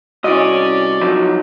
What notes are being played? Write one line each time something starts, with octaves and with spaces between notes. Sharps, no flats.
C2 C#4 E4 F#4 D5 D#5
F3 F#3 D#4